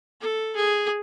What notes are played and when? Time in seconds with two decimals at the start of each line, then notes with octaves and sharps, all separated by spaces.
0.21 A4
0.56 G#4